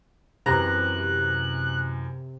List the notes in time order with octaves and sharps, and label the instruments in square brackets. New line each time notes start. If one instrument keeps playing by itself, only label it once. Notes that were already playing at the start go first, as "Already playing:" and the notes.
[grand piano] F#2 E3 [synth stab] C3 [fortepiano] A#5 [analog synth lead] F#6